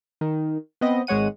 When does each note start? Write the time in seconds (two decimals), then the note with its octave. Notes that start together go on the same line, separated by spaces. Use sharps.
0.21 D#3
0.81 B3 C4 B4 D#5
1.07 G#1 G#3 C#5 F#5 D#7